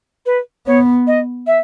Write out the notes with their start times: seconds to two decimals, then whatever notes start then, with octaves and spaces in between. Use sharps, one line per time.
0.26 B4
0.67 B3 C#5
1.07 D#5
1.47 E5